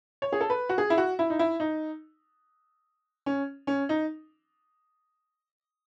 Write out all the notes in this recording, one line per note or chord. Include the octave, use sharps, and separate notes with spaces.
C#5
G#4
A4
B4
F#4
G#4
E4
F#4
E4
D#4
E4
D#4
C#4
C#4
D#4